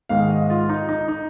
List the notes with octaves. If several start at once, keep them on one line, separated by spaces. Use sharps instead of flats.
G#2 D#3 G#3 F5
D#5
F4
D#4
D#4
D#4